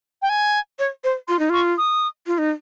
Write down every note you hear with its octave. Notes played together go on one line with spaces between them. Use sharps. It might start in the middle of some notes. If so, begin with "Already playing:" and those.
G5
G#5
C#5
C5
F4 C6
D#4
F4 C#6
D#6
F4
D#4